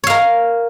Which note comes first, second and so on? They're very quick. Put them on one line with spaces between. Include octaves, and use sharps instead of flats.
C#5 F5 A#4